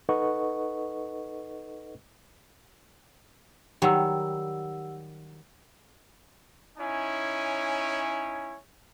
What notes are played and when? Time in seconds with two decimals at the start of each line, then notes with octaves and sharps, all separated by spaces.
0.09 D#4 A4 B4 D#5 F#5 C#6
3.82 D#3 F#3 G3 G4 F#5 E6
6.78 C#4 D#4 E4 C#5 G#5